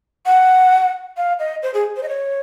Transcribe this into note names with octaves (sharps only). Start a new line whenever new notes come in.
F#5
F5
D#5
C5
G#4
C5
D#5
C#5